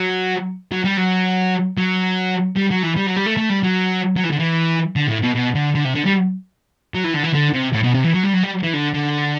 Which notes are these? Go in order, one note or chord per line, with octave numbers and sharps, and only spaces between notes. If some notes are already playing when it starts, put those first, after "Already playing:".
Already playing: F#3
F#3
G3
F#3
F#3
G3
F#3
E3
G3
F#3
G3
A3
A3
G3
F#3
F#3
E3
D3
E3
D3
A2
B2
B2
D3
D3
C3
D3
G3
F#3
E3
D3
E3
D3
C3
A2
B2
C3
E3
F#3
G3
F#3
G3
E3
D3
D3